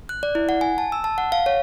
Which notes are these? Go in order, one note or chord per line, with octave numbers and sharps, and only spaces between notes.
F#6
D5
E4
F#5
G#5
A5
E6
A5
F#5
F5
C#5